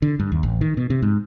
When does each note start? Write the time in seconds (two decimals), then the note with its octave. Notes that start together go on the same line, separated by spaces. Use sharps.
0.02 D3
0.19 G2
0.32 D#2
0.43 A1
0.61 D#3
0.77 B2
0.90 C3
1.02 G#2